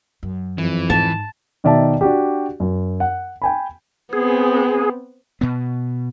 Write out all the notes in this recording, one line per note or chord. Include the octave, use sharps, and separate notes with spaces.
F#2
F2 E3
G#2 A5
B2 D#3 D5 E5 A5
D4 F#4 G4
F#2
F#5
G5 G#5 B5
B3 C4 G#4
B2 B3